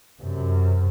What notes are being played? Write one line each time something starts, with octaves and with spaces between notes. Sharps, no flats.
F#2 C3